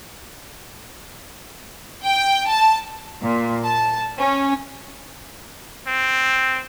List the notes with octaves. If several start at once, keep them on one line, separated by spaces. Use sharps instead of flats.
G5
A5
A#2
A5
C#4
C4